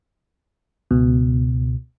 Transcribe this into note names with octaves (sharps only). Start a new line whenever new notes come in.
C#2 B2